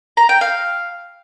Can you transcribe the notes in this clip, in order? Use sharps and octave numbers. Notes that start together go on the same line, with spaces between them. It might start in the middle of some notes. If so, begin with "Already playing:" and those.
A#5
G5
F5